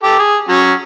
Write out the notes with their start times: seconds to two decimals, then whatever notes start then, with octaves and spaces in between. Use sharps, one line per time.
0.03 G4 A4
0.19 G#4
0.48 F#3 C#4